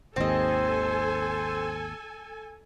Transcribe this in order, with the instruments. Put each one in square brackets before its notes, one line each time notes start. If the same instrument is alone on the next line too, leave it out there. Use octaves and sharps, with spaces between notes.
[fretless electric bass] G#1 D#2 [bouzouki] C4 D#5 [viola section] A4 G#5 [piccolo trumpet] C5